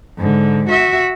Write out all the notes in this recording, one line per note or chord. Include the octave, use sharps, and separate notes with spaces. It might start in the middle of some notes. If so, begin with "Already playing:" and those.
G#2 D3
F#4 E5